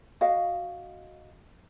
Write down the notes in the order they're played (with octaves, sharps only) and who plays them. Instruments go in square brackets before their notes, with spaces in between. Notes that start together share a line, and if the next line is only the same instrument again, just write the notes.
[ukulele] F#4 D#5 F5